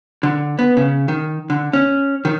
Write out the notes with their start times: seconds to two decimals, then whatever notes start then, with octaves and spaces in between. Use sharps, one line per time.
0.23 D3
0.59 B3
0.77 C#3
1.08 D#3
1.50 D3
1.73 C#4
2.25 D#3